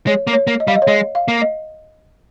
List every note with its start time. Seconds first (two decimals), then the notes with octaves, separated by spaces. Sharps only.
0.07 G#3 C#5
0.27 A#3
0.33 C#5
0.47 A#3
0.60 D#5
0.67 G3 F5
0.76 D#5
0.82 C#5
0.87 G#3 D#5
1.15 F5
1.28 A#3
1.42 D#5